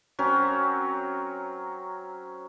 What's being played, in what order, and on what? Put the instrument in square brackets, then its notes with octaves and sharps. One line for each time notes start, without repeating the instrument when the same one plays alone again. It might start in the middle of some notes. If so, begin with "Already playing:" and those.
[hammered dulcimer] F#3 C4 C#4 A#4